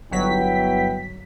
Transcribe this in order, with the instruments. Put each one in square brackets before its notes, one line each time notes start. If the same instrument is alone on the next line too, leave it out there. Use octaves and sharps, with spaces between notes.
[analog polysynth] G1 F#3 B6 [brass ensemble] B3 E4 G5